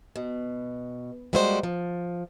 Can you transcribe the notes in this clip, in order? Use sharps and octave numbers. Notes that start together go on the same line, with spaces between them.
B2
G3 G#3 A#3 E4 F#4 C5
F3